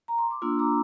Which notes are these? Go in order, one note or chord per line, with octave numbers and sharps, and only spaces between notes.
A#5
C6
D6
A#3 D4 F4 C6 E6
A#5 D6